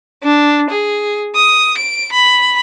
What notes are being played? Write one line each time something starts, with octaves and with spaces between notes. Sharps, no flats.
D4
G#4
D#6
D7
B5